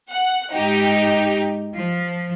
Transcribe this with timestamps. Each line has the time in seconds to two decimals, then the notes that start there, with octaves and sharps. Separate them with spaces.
0.11 F#5
0.53 G#2 D#4 G4
1.75 F3